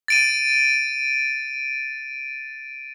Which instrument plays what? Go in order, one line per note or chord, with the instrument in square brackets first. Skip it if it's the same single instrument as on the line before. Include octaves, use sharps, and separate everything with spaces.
[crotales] A6 D7 D#7